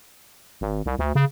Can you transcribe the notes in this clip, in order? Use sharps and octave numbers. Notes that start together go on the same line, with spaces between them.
G#1
C2
D2
C#3